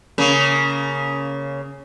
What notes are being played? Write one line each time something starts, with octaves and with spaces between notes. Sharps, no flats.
C#3 A#3